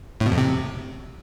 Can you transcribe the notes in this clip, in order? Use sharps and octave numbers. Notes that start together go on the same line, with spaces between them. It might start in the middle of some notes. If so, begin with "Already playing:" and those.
A2
B2
F2
C3